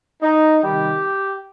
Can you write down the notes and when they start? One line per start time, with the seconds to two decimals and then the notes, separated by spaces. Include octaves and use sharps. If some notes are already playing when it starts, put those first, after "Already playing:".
0.22 D#4
0.62 C3 D#3 G3 G4